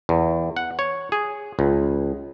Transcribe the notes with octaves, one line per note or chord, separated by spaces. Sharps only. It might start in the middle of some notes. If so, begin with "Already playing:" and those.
E2
F#5
C#5
G#4
C#2